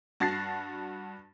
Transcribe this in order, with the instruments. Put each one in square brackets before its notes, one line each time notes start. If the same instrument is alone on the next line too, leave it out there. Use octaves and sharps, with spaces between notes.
[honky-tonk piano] G2 F#4 A5 A6 A#6 C7